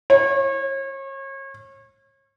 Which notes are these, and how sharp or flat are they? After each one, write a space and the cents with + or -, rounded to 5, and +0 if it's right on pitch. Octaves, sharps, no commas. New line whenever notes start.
C#5 -35